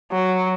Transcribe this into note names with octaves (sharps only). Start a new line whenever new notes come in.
F#3